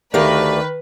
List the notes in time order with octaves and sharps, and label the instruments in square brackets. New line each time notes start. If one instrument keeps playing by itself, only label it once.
[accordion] D2 A3 D5 [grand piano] D#3 [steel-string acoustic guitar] G4 A#4 F5 [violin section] B4